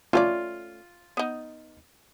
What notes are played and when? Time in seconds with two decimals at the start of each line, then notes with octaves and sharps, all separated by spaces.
0.13 A3 C#4 F4 D5
1.17 B3 D#4